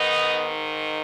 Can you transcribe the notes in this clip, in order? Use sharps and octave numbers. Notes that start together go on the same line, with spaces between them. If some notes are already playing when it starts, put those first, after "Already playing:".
Already playing: G#2 D#3 B3 D#4